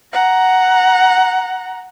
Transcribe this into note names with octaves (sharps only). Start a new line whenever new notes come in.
F#5 A#5